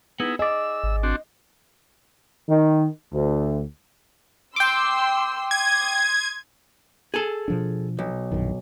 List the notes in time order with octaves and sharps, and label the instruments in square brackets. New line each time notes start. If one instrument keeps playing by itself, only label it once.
[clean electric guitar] B3 [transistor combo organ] D#4 E4 G#4
[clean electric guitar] G#4 D5 [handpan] D#5 [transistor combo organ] E6
[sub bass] G#1
[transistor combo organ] C4 D4 F#4
[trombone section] D#3
D2
[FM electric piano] G5 D6 [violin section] C6 E6
[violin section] C6 D#6 [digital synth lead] G#6
[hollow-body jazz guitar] G#4 A4
[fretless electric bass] B2 F3 D4
[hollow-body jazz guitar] B1
[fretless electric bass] A#1 F#2 D#3